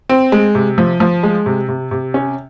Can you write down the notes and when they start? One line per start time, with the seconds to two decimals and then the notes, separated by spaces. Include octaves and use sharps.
0.09 C4
0.32 G#3
0.55 C3
0.78 F3
1.00 F3
1.23 G#3
1.46 C3
1.69 C3
1.91 C3
2.14 C#4